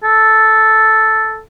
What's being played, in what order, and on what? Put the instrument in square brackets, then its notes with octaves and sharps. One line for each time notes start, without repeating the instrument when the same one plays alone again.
[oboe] A4